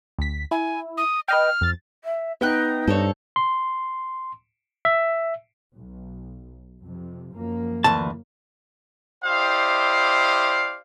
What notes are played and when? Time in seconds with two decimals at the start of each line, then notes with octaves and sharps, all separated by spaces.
0.19 D2 B6
0.51 E4 G#5
0.97 D#6
1.28 B4 D#5 G5 F6
1.61 F2 A6
2.04 E5
2.41 B3 D#4 E5 G5 F#6
2.88 G2 A4 C5 C#5
3.36 C6
4.85 E5
5.74 B1
6.85 F2 C3
7.36 F#2 F3 A#3
7.84 D2 E3 A5
9.25 E4 G4 C5 D5 D#5 F5